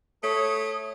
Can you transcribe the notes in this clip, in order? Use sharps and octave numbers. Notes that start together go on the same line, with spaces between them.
A3 A4 C#5 D#6